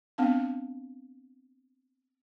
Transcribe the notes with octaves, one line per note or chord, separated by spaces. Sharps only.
B3 C4 D4 F5 A5